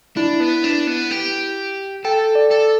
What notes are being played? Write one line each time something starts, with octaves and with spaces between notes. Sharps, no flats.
D4 E4
B3
D4
B3
G4
A4 G5
D5
A4